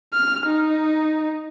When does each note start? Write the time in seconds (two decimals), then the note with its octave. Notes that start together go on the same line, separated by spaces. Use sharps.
0.14 F6
0.46 D#4